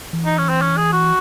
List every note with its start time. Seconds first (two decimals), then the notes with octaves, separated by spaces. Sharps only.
0.13 E3
0.25 D#4
0.38 C#4
0.49 C4
0.61 C#4
0.77 G#4
0.93 F#4